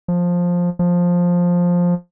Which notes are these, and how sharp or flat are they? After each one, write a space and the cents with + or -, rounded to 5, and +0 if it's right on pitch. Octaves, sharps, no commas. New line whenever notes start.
F3 +10
F3 +10